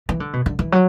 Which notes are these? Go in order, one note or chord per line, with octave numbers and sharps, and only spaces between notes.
E3
D3
B2
D3
E3
F#3